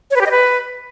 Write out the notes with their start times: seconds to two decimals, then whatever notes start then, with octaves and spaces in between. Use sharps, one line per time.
0.11 C#5
0.16 B4
0.21 G4
0.26 D#5
0.31 B4